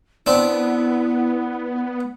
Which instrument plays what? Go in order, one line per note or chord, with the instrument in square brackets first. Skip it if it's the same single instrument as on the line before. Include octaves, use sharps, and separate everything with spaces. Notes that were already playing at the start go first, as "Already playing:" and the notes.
[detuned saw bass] B3 [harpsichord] C4 D4 [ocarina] E4